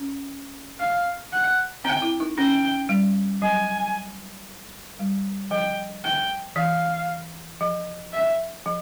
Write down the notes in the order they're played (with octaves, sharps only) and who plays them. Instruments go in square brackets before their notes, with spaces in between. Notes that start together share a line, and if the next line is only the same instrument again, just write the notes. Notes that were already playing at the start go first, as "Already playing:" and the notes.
Already playing: [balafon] C#4
[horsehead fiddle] F5
F#5
[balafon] C4 [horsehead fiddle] G5
[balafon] E4
D#4
[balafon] C#4 [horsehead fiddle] G5
[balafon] G3
[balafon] F#3 [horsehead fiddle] G#5
[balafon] G3
[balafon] F3 [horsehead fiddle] G5
[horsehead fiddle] G5
[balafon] E3 [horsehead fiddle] F5
[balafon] F3
[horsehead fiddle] E5
[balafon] F3